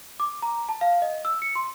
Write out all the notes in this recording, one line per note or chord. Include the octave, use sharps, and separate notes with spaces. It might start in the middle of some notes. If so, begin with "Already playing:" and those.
D6
A#5
A5
F5
D#5
E6
C#7
C6